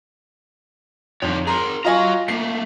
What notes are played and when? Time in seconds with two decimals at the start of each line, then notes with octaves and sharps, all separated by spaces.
1.22 F2 D3 D#4 C#5
1.47 G#4 A#4 A#5 C6
1.85 F4 F#4 D#5 G#5 A#5
2.28 A3 A#3 C7